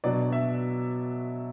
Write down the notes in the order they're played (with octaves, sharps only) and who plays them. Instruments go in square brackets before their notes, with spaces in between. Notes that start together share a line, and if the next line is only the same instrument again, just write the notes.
[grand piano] B2 F#3 B3 D4 D5
E5